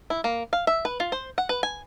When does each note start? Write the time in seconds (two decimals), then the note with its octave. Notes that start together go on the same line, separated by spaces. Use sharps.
0.10 E4
0.24 A#3
0.53 F5
0.67 E5
0.85 B4
1.00 F4
1.12 C5
1.38 F#5
1.49 B4
1.63 G#5